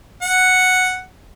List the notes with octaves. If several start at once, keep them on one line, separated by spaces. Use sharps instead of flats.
F#5